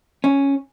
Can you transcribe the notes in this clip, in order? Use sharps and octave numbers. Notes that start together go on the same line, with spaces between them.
C#4